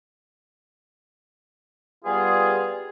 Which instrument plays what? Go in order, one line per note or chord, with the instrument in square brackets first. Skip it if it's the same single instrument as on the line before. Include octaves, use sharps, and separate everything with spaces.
[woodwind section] G3 B3 F4 G#4